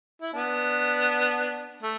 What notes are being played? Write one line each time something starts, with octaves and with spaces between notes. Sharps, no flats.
E4
B3 D4
A3